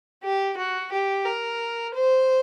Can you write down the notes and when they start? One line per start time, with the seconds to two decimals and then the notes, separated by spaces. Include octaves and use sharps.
0.23 G4
0.57 F#4
0.92 G4
1.26 A#4
1.94 C5